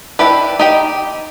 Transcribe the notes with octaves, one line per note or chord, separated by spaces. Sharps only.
D4 E4 G4 B4
D#4 G4 G5